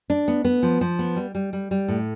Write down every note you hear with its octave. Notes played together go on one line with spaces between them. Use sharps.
D4
B3
B3
F3
F3
B3
G3
G3
G3
G3
A2